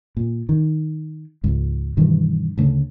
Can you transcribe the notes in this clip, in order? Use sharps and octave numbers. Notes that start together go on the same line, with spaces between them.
A#2
D#3
C#2 G#2
G2 B2 D#3 E3
D2 C#3 A3